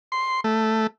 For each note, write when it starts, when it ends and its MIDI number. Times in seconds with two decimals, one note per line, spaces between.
0.12 0.41 84
0.44 0.87 57